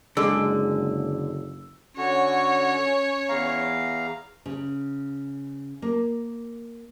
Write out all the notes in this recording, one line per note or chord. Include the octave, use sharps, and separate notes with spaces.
F#1 D3 G#3 E6
D3 C#4 F#4 C#5
E2 F5 A#5
C#3
A#3